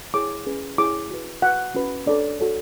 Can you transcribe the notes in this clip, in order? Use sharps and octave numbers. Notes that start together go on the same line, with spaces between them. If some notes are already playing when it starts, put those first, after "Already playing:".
E4 G#4 C#5 D6
C#4 G#4 B4
E4 G#4 C#5 D6
F#4 B4
F#4 B4 F#5
C#4 F#4 B4
D4 A4 C#5 D5
F#4 A4 C#5